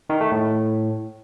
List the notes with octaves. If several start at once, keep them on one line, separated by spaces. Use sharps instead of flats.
D#3
A3
A2